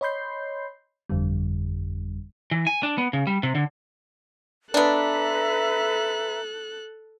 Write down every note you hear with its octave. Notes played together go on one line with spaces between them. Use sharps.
C#5 D#5 B5 C6 G6 C7
G1 F2 D3 G3
E3
G#5
D4
B3
C#3
G3
C3
D3
B3 D4 A4 B4 E5 A#5 F#6